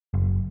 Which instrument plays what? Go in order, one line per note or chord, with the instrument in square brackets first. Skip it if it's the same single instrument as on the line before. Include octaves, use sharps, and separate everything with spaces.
[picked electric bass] F#1